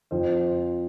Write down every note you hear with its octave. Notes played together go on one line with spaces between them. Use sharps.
F2 F3 C5